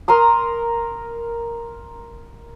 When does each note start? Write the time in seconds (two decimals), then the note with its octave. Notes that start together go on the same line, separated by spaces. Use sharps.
0.08 A#4 A#5 C6 D#6